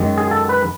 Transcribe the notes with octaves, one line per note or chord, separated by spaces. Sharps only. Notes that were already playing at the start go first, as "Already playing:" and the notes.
Already playing: F#2 D#3 G#3
G#4
A4
B4